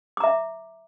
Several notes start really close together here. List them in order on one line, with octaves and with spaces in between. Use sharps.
D6 A#5 E5